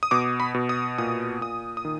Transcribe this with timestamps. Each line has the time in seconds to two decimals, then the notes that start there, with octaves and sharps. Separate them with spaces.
0.03 D#6
0.11 B2 D6
0.40 B5
0.54 B2
0.69 D#6
0.98 A#2 D#6
1.41 A#2 D#6
1.77 D#6
1.85 D#3